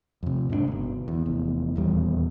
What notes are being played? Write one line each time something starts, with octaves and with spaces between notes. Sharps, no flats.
F2 C3
G#2 C3 B3 D4
G1 B2
E2
F1 E2
D#1 E2 G3